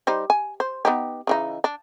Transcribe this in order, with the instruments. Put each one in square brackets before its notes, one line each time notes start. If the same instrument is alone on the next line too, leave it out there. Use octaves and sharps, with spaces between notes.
[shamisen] G3 D#4 C5
G#5
C5
B3 D#4 G4
C#3 E3 D#4
D4